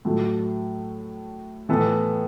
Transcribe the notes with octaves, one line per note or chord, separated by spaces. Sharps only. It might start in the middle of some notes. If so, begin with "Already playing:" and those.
A2 F#3 A3
A2 E3 B3 E4 A4